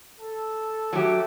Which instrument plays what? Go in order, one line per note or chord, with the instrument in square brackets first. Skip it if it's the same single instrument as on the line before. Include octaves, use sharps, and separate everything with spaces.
[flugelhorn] A4
[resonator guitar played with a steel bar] F#3 G4 [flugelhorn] A3